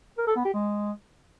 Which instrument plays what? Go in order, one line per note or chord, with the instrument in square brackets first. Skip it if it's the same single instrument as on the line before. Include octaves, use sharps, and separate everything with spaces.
[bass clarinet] A#4
A4
B3
G4
G#3